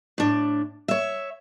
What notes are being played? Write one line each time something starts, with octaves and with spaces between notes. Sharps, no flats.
A2 D4
C#5 E5